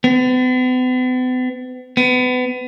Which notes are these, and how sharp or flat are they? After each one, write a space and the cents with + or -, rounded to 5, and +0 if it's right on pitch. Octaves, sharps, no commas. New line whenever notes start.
B3 +45
B3 +30